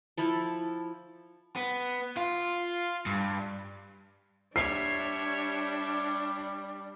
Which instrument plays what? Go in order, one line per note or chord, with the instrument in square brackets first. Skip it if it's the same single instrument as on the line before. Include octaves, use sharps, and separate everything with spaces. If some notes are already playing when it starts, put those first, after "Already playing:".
[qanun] F3 E4 A4
[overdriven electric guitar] B3
F4
G2
[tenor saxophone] G3 [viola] D4 [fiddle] C#5 E5 [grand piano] C7